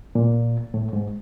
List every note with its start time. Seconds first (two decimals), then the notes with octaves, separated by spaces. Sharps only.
0.15 A#2
0.74 A2
0.93 G#2